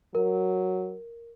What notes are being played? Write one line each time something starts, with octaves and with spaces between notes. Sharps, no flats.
F#3 A#4